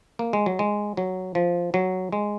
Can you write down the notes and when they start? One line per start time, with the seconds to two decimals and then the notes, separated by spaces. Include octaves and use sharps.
0.19 A#3
0.33 G#3
0.46 F#3
0.59 G#3
0.97 F#3
1.35 F3
1.74 F#3
2.12 G#3